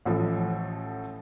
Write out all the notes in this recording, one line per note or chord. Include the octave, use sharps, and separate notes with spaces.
A1 A2 F3